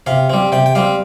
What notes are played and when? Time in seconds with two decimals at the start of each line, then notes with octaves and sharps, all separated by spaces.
0.06 C3 F5
0.30 G3 C4
0.52 C3 G5
0.66 G5
0.75 G3 C4 F5